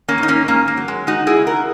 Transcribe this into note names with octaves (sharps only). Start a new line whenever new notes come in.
A#3 C#4
G#2
D#4
A#3 C#4
G#2 A#3 C#4
A#3
F#3
G#3
G#3 D#4 F#4
E4 G#4
C#3
F#4 A#4